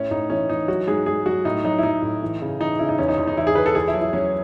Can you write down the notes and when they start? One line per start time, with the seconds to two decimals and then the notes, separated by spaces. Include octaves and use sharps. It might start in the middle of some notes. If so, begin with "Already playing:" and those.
Already playing: A2 C#4
0.11 A2 D#4
0.30 E3 C#4
0.49 E3 D#4
0.68 F#3 F#4
0.88 G#2 G#4
1.06 G#2 G#4
1.26 F#3 F#4
1.45 A2 D#4
1.64 F#3 D#4
1.78 E4
1.83 F#3 D#4
2.02 A2
2.22 E3
2.41 C#3
2.60 E3 D#4
2.79 C#3 E4
2.89 D#4
2.98 E2 C#4
3.09 D#4
3.18 E2
3.27 D#4
3.37 E2 E4
3.47 G#4
3.55 E2 B4
3.66 A4
3.75 E2 G#4
3.88 E4
3.94 F#3
4.01 E4
4.13 F#3 C#4